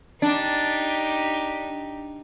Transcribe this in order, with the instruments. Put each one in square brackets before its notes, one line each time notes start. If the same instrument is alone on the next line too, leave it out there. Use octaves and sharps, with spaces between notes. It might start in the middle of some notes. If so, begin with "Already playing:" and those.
[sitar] D4 [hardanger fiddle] D#4 G4